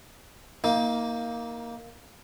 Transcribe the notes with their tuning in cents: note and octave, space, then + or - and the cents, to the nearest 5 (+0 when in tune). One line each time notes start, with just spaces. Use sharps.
A#3 +0 D#4 +30